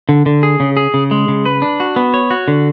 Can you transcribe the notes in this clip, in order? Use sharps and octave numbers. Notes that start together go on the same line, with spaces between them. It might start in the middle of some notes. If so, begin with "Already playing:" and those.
D3
D3
G#4
C#3
G#4
C#3
G#3
C#3
B4
D4
F#4
B3
C#5
F#4
D3